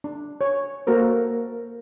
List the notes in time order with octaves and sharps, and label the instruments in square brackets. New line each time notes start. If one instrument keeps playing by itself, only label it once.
[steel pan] D4
C#5
A#3 F#4 A4 A#4 C5